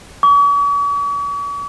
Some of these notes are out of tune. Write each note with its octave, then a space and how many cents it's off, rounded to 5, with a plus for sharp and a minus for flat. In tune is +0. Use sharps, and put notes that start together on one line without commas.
C#6 +45